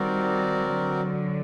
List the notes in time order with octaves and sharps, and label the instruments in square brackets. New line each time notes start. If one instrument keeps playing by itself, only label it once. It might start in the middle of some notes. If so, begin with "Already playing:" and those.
Already playing: [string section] D#3 G3 [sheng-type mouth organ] C4 F#4 A#4 D5
[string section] D3 F#3